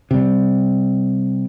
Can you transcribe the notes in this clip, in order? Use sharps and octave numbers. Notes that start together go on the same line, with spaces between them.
C3 G3